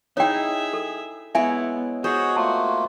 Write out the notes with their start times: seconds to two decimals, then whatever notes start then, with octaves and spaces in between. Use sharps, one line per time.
0.17 D#4 E4 G#4 C#5 E5 G5
0.73 A4
1.35 G#3 B3 E4 C#5 E5 G#5
2.04 F#4 G#4 C5 C#5 D#5
2.36 A3 A#3 F4 A5